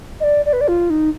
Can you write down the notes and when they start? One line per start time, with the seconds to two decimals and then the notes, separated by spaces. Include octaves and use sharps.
0.20 D#5
0.24 D5
0.45 D5
0.53 B4
0.61 D5
0.68 F4
0.90 D#4